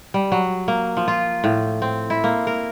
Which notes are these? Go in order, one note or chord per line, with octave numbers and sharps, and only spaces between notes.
G3
F#3
A#3
F3
F4
A2
C4
E4
A#3
A#4